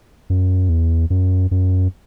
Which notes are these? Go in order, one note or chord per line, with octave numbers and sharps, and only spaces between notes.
F#2
E2
F#2
F#2